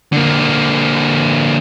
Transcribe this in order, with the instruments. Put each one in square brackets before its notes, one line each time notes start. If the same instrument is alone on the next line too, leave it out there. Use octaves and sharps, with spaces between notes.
[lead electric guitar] D3 A#3